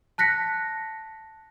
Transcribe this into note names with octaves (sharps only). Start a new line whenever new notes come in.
A5 F#6 A#6 B6 C#7